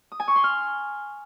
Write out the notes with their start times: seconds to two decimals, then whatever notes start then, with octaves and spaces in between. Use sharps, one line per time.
0.12 D#6
0.20 G#5
0.28 C#6
0.36 C6
0.44 F6